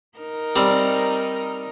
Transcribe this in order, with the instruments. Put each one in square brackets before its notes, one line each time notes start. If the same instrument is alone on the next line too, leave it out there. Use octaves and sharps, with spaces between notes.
[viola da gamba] D#4 A#4
[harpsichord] G3 C4